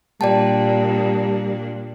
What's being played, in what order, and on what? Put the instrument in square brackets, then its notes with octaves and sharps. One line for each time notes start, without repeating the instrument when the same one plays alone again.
[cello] A#2 D4 [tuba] G3 [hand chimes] D5 G5 A5